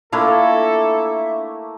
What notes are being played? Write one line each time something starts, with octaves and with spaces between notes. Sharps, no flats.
A3 A#3 D4 E4 F4 A4 E5